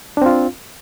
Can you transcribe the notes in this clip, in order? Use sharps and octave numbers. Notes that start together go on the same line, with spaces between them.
C4 D4 F4